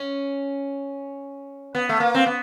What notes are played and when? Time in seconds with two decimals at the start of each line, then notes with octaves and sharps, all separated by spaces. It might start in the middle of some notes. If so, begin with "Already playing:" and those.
Already playing: C#4
1.75 B3
1.89 A3
2.00 A#3
2.15 C4
2.26 B3